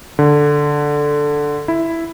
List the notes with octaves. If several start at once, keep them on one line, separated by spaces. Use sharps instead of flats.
D3
E4